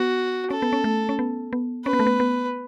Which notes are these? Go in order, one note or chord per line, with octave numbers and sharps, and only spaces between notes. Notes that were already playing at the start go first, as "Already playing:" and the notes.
Already playing: B3 F#4
C#4 A4
B3
C#4
A3
C#4
B3
B3
C#4 B4
B3
A3
B3
B3